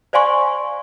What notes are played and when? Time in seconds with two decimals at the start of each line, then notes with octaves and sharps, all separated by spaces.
0.13 C5 D5 F5 G#5 C6 C#6